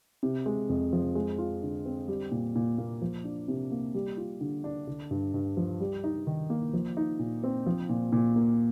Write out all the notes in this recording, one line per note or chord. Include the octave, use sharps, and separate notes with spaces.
C3
G#3
F2
F3
G#3
F4
D3
C4
G3
A#2
A#2
A#3
F3
D4
C3
A#3
G3
F4
D3
D4
D3
G2
G2
F3
G3
D#4
D#3
A#3
F3
D#4
A#2
C4
F3
A#2
A#2
A#3